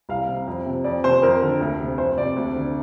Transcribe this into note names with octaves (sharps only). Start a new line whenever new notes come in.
C2 F5
C3
F2
C3
F2 D5
C3 C5
F2 A#4
D3
D2
C3
F2 C5
C3 D5
D2
D3